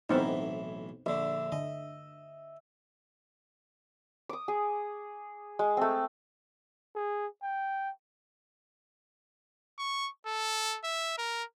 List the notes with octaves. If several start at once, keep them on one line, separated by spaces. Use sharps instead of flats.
B1 A2 E3 B3 C4 D#4
A#1 D3 E5
D3 D#5
D6 D#6
G#4
G#3
A3 C4
G#4
G5
C#6
A4
E5
A#4